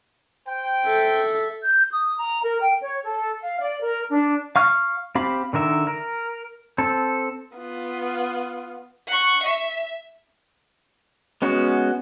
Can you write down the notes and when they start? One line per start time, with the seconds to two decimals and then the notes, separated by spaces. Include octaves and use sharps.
0.46 C5 G5
0.86 A4 E5
1.63 G6
1.91 D#6
2.17 A#5
2.43 A#4
2.60 G5
2.80 C#5
3.03 A4
3.41 F5
3.60 D5
3.81 A#4
4.10 D4
4.56 F5 C#6 F6
5.15 C4 G4 F5 B5
5.53 D3 D#3 A#4 E5
5.87 A#4
6.78 C4 A4
7.55 B3 F4
9.08 F#5 C#6
9.43 E5
11.42 G#3 B3 C#4 F#4